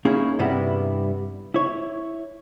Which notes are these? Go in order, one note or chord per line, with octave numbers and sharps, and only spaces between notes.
A#3 C#4 D#4 E4 G#4
G2 C3 G3 B3 E4
E4 C#5